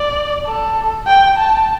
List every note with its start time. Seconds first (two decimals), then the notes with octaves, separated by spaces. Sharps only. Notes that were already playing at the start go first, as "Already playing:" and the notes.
Already playing: D5
0.46 A4
1.07 G5
1.37 A5